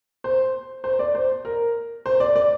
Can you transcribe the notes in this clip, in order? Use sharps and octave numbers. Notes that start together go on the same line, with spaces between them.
C5
C5
D5
C5
A#4
C5
D5
D5